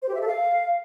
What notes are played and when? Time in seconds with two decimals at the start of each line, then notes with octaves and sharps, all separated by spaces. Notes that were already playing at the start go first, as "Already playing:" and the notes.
0.02 C5
0.09 G4
0.15 E5
0.21 A4
0.27 F5